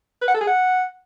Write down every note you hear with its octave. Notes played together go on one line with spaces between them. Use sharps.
B4
F#5
A4
G#4
F#5